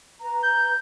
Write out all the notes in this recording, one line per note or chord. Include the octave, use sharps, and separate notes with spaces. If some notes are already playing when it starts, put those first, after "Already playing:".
B4 A#5
G6